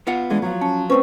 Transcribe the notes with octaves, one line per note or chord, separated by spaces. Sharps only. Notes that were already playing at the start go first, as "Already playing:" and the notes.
B3 F4 F#5
E3 G#3 D4
F3 F#3
C#4 A5
A3 C4 C#4 B4 C5 C#6